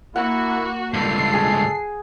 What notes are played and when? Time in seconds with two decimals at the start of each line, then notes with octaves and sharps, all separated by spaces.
0.16 A#3 E4 F#4 F#5
0.94 C#2 G2 A4 C7
1.34 G#4